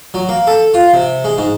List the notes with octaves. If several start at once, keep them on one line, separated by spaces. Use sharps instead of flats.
F#3
A#3
A4
F4
C3
G#3
G#2